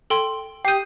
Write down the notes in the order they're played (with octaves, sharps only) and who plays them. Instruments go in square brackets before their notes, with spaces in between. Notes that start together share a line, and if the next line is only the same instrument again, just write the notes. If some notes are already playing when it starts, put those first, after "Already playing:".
[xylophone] A4 G5 C6
[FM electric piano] G4 D#6 [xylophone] G6 C7